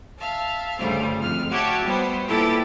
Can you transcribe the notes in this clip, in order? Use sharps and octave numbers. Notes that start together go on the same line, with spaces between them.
E5 F5 A5
D2 G2 C#3 G3 C5 F5
F2 G#2 F6
F#4 G4 C#5 E5 G5 A5
G3 B3 C5
A#2 E4 G4 A4 B4 A6